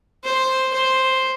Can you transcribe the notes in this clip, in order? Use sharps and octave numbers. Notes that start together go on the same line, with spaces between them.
C5
C5